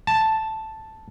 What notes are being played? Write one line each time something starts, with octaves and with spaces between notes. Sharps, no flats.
A5